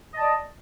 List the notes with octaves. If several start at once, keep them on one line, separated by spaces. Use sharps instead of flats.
D5 D#5 A5